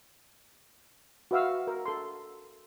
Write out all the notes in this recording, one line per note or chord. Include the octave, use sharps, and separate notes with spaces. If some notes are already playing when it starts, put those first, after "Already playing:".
F#4 B4 E5 F5 E6
A#4
A4 C6